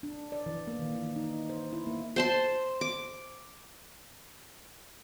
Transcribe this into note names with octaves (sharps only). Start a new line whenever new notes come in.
D4
D5
E3
A#3
D#3
E3
D#4
C5
E4
A#3
C5 A5 C6
D6